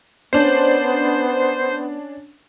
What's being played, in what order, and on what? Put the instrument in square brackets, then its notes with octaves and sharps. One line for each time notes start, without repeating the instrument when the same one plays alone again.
[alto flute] B3 [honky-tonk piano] C#4 D4 [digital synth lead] C5